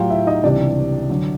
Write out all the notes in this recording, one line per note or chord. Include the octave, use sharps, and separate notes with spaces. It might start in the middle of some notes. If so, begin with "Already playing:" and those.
Already playing: A2 F#3 F4 G4 F5 G5
E4 E5
D#4 D#5
C#2 C3 E3 G3 D4 D5
D3 F#3